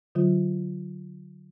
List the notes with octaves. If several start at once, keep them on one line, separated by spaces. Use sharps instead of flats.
D3 F#3 F4